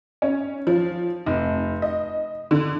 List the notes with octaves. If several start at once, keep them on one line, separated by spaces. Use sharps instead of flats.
C#4
F3
F1
D#5
D3